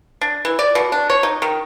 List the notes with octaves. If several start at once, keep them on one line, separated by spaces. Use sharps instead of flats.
D4
E3
D5
B2
D4
C#5
D#4
D#3